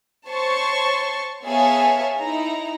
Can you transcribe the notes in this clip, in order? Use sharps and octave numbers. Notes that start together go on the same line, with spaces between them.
C5 C#5 A5 C6 C#6
B3 G#4 C#5 E5 F5 A5
D#4 E4 A#5